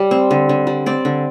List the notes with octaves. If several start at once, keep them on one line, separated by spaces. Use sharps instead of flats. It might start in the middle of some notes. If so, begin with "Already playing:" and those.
Already playing: G3
C4
D3
D3
G3
C4 D5
D3